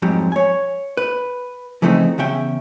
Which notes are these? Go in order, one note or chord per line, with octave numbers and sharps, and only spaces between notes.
F2 G#2 F#3 G3
C#5 G#5
B4
C#3 E3 F3 A3 C4 D#4
E2 C#3 C#4 E5 G5